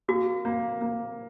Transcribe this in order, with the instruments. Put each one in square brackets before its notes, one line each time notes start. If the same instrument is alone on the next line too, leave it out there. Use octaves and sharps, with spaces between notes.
[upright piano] A#3 [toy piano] F#4
[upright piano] A#3
A#3